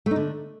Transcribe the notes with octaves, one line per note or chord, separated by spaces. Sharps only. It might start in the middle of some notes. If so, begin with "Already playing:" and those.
A3
D#4
D3